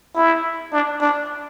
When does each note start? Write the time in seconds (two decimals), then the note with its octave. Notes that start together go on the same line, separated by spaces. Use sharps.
0.15 E4
0.72 D4
1.01 D4